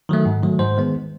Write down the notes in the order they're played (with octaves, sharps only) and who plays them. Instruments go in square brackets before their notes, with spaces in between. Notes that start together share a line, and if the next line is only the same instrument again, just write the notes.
[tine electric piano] D#3 F#3 A3
G#2
D#3 F#3 A3
G#2 C5
D#3 G#3 B3